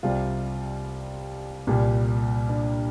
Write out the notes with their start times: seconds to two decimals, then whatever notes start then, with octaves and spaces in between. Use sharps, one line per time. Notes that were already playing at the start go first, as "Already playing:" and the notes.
0.03 C2 C3 G3 F4
1.67 C2 A#2 G3
2.49 D4